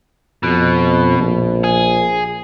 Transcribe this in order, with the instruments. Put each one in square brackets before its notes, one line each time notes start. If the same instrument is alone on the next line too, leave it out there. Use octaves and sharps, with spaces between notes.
[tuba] F2 [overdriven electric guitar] B2
[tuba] A#1
[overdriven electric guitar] G#4